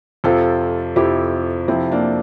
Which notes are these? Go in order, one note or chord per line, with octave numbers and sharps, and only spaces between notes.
F2 C3 F3 F4 A4
F2 C3 F3 E4 G4
F2 C3 F3 C4 E4
A#3 D4